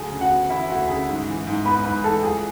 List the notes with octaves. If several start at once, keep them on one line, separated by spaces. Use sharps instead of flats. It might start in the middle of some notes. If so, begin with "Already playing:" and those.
Already playing: D2 F#3 G#4 G#5
C#3
F#4 F#5
B3
E3 E4 E5
D2 F#4 F#5
C#3 G#4 G#5
G#2
E3
G#2
B3 B4 B5
G#2 B4 B5
E3 A4 A5
C#2 G#4 G#5